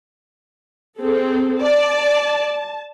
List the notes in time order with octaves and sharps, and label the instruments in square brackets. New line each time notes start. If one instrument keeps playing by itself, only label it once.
[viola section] C4 G#4 A4
[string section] D5 [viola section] A5